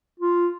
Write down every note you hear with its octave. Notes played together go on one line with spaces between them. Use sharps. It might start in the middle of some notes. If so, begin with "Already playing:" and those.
F4